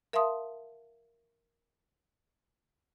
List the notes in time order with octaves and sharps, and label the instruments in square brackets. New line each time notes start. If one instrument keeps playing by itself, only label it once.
[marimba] A#4 E5 F5 A5 C6 D#6